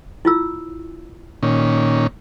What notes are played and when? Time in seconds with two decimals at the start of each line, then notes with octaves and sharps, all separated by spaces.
0.25 E4 F4 E6
1.43 A#2 D#3 C#4